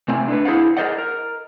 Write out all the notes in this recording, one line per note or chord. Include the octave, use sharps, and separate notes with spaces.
C3 A3 C4 D5 G#5
D4 A4 B4
E4 G#4 C5 D5 F5 F#5
G#4 A#4 C5 D5 D#5 F#5
A#4